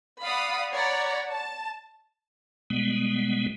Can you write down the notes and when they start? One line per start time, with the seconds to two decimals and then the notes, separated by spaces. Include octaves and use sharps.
0.23 D5 F5 F#5 B5 D#6
0.73 C#5 D5 F#5 A#5 B5
1.31 A5
2.70 B2 G3 G#3 B3